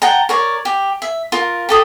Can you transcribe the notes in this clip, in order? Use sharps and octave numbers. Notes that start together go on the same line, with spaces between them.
F#5 G5 A5 A#5
A#4 C#5 D5
G4
E5
F4 A#4
G4 A4 D#6